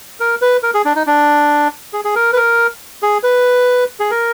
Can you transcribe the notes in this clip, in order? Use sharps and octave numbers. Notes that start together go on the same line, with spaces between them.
A#4
B4
A#4
G#4
D4
D#4
D4
G#4
G#4
A#4
B4
A#4
G#4
B4
G#4
A#4